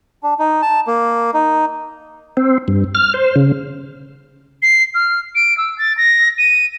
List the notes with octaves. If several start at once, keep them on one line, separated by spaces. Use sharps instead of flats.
D4
D#4
A5
A#3
D#4
C4
G2
F6
C5
C#3
C7
F6
D7
E6
A6
A#6
D#7